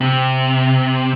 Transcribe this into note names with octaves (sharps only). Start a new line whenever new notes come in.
C3